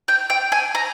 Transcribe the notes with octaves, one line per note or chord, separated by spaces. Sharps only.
G5
G5
G#5
A#5